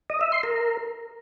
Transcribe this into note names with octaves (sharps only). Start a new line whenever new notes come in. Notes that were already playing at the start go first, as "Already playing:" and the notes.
D#5
E5
C6
A#4